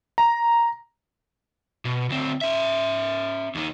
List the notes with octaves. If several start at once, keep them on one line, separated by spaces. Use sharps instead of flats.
A#5
B2
D2 C4
C#4 E5
D#2 D#3